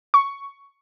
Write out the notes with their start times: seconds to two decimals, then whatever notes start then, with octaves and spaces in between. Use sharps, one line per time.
0.14 C#6